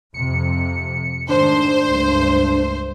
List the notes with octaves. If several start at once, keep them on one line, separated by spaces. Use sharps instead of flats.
F2 C3 C#7
G#2 D#3 A3 D4 C5
C#2 G2 A3